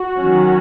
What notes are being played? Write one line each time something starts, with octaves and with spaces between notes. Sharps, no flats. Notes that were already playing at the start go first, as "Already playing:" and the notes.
Already playing: F#4
D#3 F#3 C#4